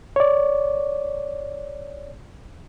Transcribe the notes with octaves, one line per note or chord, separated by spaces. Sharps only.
C#5 D5